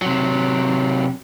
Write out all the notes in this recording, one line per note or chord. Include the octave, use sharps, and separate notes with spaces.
C3 F#3